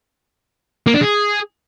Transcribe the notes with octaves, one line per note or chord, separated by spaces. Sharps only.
A#3
D4
G#4